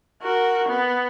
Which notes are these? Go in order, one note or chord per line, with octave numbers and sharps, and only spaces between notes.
F#4 A#4
B3